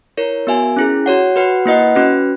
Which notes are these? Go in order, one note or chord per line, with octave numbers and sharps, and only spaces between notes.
E4 A#4 C#5
B3 F#4 A#4 E5 G#5
C#4 E4 G#4
F#4 C#5 F#5
F#4 B4 F#5
A#3 E4 B4 D#5 F#5
C#4 F#4 B4